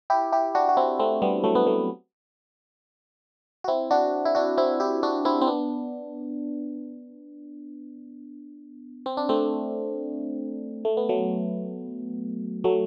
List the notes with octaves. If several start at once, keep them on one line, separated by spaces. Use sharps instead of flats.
E4 G4
E4 G4
D4 F#4
F#4
C4 E4
A3 C4
G3 B3
F#3 A3
B3
F#3 A3
F#4
C4 E4
D4 F#4
E4
D4 F#4
C4 E4
E4 G4
D4 F#4
C4 E4
C4
B3 D4
C4
D4
A3 C4
A3
B3
F#3 A3
F#3 A3